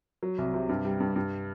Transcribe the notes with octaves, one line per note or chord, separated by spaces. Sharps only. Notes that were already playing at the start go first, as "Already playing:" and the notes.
F#3
C2
C3
G2
G3
G2
G2